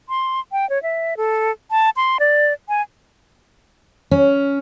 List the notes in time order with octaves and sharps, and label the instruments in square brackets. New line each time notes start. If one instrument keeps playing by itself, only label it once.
[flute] C6
G5
C#5
E5
A4
A5
C6
D5
G#5
[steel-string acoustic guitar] C#4